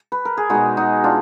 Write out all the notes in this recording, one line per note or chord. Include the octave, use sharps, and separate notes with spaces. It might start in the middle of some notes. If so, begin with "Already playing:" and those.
Already playing: D5
B4
A#4
G#4
B2 G#3 D#4 F#4
D#4 F#4
D4 F4